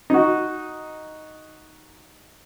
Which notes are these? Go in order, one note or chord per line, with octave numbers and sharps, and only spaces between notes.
D#4 F#4